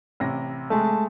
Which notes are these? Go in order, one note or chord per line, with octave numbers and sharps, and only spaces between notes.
A1 C3 A#6
G#3 A3 A5